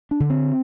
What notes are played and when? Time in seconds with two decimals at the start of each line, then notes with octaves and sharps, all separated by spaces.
0.11 D4
0.20 D3
0.30 C4